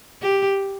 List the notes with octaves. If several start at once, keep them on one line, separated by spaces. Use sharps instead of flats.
G4